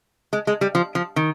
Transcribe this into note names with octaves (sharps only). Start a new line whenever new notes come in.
G#3
G#3
G3
F3
F3
D#3